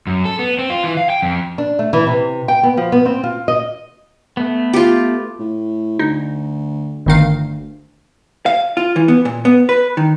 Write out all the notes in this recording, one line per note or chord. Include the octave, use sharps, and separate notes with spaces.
F#2
A4
B3
C4
F4
E3
F5
G5
F2
D4
A3
E3
C3
G5
B3
F3
B3
C4
F4
D#5
A3 B3
F4 G4
A2
D2 D#4
G1 D2 D#3 F5
F5
F4
E3
B3
A#2
B3
B4
D#3